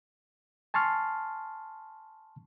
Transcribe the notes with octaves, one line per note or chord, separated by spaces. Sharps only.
G#5 A5 C6 C#6 F6